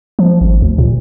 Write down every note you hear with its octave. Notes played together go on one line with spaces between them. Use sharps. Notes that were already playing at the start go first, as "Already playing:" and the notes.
F3
G#1
D2
A#2